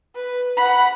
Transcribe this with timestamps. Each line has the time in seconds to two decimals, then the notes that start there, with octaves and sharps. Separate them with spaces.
0.15 B4
0.57 F#5 B5